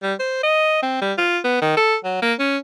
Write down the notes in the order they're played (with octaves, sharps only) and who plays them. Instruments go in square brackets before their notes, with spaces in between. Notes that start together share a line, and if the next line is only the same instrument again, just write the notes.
[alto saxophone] G3
C5
D#5
C4
G3
F4
B3
D#3
A4
F#3
A#3
C#4